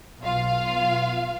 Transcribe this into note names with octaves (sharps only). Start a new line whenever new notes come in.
B1 F4 F5